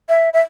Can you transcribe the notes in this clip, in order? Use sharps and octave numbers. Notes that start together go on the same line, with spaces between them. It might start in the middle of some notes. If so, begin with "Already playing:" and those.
E5
E5